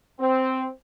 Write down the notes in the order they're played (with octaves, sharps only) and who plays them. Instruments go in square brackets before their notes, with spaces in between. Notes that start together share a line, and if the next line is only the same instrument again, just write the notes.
[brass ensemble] C4